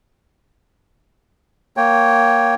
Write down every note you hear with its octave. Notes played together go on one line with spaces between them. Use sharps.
A#3 C#5 G5